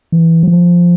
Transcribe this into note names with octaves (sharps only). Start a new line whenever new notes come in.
E3
F#3
F3